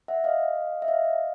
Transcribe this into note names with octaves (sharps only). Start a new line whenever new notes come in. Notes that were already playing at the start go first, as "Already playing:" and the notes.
E5 F#5
D#5 F5
E5
D#5 F5